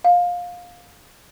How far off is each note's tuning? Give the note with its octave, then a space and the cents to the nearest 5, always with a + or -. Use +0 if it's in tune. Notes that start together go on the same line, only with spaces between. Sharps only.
F5 +20